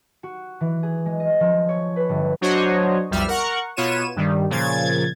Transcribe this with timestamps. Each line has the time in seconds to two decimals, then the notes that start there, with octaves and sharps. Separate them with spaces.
0.23 F#4
0.61 E3
0.83 G#4
1.06 G#3
1.20 D#5
1.40 F3
1.69 C#5
1.96 B4
2.09 G1
2.41 F#3 D4 F#4 C5 C#5 D#5
3.11 B1 F2 G3 E5 F6
3.28 A#4 F#5 C#6
3.76 B2 B3 F4 C#5 D#7 E7
4.16 G2 D#3 G3
4.50 A#2 C#3 F3 G#6 A6